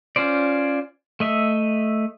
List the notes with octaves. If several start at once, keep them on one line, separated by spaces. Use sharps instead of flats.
C#4 F4 C5 D5
A3 D#5 E5